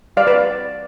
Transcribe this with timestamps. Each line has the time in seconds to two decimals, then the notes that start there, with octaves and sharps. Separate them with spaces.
0.17 G3 D5 F5
0.27 B4 D5
0.33 C4